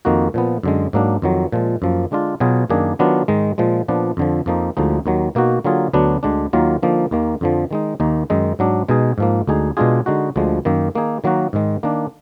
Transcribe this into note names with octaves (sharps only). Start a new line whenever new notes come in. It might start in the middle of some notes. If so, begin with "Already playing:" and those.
F2 D#3 A#3 D#4 F#4
A#2 F3 B3
F#2 D3 G#3
G#2 F#3 A#3 D4
F2 D#3 F#3
A#2 F3 G#3
F#2 F3 A#3
D3 G#3 D4 F4
B2 F#3 B3 F4 G#4
F#2 D#3 A#3 D4 G#4
D#3 F#3 B3 D4 F4
G#2 D#3 G#3 D#4
A#2 F3 G#3
A#2 F3 B3 D4
F2 D3 F3
F2 F3 A#3 D#4
D2 D3 F3 G#3 D#4
D#2 D#3 F#3
B2 A#3 D#4 F#4
D3 F#3 A#3 F4 G#4
D2 D3 F#3 B3 D4
D2 D3 G#3 D4
D#2 D#3 F#3 A#3 F4
D3 F3 A#3 D#4
D#2 D#3 A#3
F2 D3 F3
D#3 G#3 D#4
D#2 D#3 A#3 D#4
F#2 D#3 G#3 D#4
G#2 F#3 D4
B2 G#3 D#4 G#4
G#2 F3 A#3
D2 D3 G#3 D#4 G#4
B2 G#3 D4 F4 G#4
D3 G#3 D#4 F#4
D2 D3 F3 G#3
F#2 D#3 A#3 D#4
D#3 A#3 D#4 G#4
D#3 F#3 A#3 D#4 F#4
G#2 D#3 G#3
D#3 A#3 D4